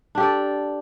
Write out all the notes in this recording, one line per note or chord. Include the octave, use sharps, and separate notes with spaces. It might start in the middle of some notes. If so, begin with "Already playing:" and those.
D4 G4 A4 D5